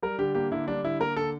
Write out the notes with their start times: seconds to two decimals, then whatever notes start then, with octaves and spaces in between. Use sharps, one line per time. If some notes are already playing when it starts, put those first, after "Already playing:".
0.02 G3 A#4
0.18 D3 G4
0.35 A#3 G4
0.51 D3 E4
0.68 G3 D4
0.83 D3 E4
1.00 A#3 A#4
1.16 D3 A4